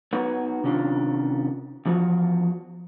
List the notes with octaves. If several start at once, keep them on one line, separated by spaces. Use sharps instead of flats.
B3 D#4 F#4 B4 C#5
C3 D#3 C#4 D4 F4
E2 F3 F4 F#4